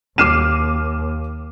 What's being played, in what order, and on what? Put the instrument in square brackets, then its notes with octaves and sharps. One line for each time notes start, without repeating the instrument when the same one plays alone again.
[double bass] D#2 [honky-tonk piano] D6 C7 [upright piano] F6 D#7 E7